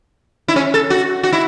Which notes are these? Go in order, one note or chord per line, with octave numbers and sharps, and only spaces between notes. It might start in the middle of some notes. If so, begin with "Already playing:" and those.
E4
C#4
A4
F#4
F#4
E4